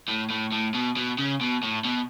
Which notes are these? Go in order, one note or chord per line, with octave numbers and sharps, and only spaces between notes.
A2
A2
A2
B2
B2
C#3
B2
A2
B2